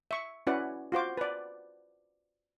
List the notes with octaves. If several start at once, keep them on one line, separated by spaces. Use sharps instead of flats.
E5 C#6
C#4 E4 F#4 B4 D5 F#5
F4 F#4 C5 D6
B4 D5